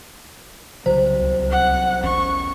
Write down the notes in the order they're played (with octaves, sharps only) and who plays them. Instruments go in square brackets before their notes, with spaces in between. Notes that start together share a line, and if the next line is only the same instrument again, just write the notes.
[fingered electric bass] C2 F#3 G3 [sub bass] C#3 [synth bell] C5
[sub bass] C#2
[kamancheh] F#5
[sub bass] B1 [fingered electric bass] E2 C#4 [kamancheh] C#6